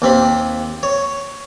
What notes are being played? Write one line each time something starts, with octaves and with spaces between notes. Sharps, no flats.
D#2 C4 B5
C#5